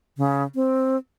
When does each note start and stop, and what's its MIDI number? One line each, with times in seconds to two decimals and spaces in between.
0.18 0.43 49
0.55 0.97 60